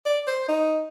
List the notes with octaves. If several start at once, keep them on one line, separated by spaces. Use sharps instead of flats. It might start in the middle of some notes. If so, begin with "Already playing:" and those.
D5
C5
D#4